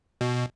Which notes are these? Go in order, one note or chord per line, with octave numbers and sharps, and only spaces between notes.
B2